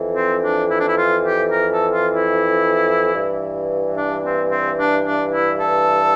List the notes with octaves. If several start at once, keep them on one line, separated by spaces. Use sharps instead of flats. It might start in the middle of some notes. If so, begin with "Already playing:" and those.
Already playing: F2 E3
C4
D4
E4
D4
E4
F4
G4
A#4
A4
F4
E4
G2 E3
D4
C4
C4
D4
D4
E4
A4